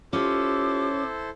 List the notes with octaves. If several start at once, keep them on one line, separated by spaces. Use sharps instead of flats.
C#4 E4 F4 G4 A4 C5 D6